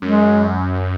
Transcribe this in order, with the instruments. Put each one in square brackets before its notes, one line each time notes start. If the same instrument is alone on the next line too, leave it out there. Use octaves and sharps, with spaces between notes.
[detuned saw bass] F#2 [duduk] G#3